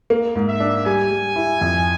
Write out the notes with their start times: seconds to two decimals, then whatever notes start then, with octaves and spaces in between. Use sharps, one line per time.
0.10 A#3
0.35 G#2
0.48 E5
0.60 D4
0.86 G3 G#5
1.11 G3
1.36 E4
1.61 F2